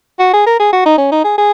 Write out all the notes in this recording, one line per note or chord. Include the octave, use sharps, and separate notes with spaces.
F#4
G#4
A#4
G#4
F#4
D#4
C#4
D#4
G#4
G#4